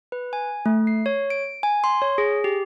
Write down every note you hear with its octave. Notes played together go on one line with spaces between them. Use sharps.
B4
G#5
A3
C7
C#5
D7
G#5
C6
C#5
G#4
G4